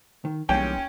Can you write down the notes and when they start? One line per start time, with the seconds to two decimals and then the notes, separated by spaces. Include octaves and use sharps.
0.25 D#3
0.49 B1 E3 G3 A#3 C#4 G5